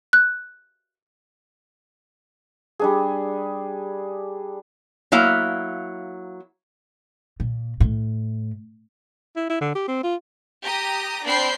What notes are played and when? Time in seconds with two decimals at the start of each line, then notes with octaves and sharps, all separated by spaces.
0.13 F#6
2.79 G3 D4 G#4
5.12 F#3 A#3 E4 F5
7.40 A#2
7.80 A2
9.36 E4
9.50 E4
9.61 D3
9.75 G4
9.88 C4
10.03 F4
10.64 G4 A#5 D#6
11.25 C4 D4 G5 B5 C7